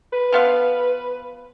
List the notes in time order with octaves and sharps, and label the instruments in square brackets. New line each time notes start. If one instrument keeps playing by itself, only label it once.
[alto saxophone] B4
[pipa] F3 B3 F5